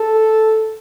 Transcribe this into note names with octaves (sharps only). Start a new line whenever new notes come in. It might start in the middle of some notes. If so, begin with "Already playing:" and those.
Already playing: A4